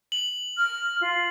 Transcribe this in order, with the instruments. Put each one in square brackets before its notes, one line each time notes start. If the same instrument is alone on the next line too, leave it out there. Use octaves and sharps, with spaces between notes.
[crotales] F#7
[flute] F6
F4